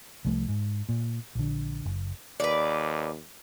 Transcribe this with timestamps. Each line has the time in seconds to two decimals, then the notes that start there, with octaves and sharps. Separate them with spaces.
0.25 C2 F3 A3
0.48 G#2
0.89 A#2
1.35 A#1 D3
1.85 F#1
2.40 D#2 B4 D5